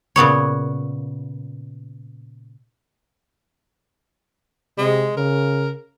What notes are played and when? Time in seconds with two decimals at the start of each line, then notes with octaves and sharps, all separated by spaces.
0.16 A#2 C#3 B3 C#5
4.78 C3 G#3
5.17 C#3 A#4